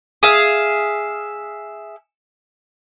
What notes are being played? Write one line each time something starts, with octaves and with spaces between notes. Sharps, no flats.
G#4 E5 F5